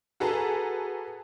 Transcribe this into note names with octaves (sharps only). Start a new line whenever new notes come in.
F#4 G#4 A4 B4 A5 A#5